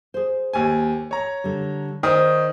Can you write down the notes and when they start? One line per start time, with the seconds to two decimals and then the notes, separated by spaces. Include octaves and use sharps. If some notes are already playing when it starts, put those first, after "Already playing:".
0.14 G#4 C5
0.53 D#2 G#5
1.11 C#5 A#5
1.44 D3 G3
2.03 D#3 C5 D5 D#6